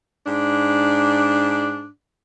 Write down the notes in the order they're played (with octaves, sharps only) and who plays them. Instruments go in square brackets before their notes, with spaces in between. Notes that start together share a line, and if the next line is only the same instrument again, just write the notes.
[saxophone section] G#2 D4